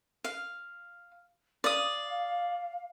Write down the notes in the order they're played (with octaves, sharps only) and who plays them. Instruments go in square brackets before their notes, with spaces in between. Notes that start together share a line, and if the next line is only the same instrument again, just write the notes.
[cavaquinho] F5
[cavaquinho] D5 D#6 [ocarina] F5